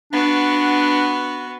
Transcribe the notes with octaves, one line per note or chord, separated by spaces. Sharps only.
B3 D4 F#4